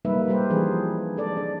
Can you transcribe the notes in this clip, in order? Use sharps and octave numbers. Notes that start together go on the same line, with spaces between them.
G3 A#3 D#4 B4 E5
G3 G#3 G4 B4 C5
E3 F3 G3 D4 G#4
G#3 A4 D5
D4